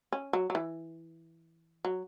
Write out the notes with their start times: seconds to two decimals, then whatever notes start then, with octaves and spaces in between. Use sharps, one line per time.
0.12 C#4
0.33 F#3
0.50 F#3
0.55 E3
1.85 F#3